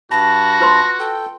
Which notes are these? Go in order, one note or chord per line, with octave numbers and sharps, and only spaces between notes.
G2 F#4 A5 B5 A#6
F4 B4 C6
A4 G5